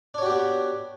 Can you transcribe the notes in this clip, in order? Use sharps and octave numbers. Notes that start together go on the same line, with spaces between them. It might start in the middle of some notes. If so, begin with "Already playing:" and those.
B3 D4 F#4 G4 C#5